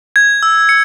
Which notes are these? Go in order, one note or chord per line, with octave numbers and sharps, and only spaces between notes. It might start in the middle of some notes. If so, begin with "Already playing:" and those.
G#6
E6
C#7